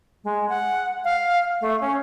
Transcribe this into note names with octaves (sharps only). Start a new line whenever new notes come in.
G#3
F#5
F5
A3
C#4